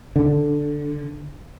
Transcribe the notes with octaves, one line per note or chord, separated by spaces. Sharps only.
D3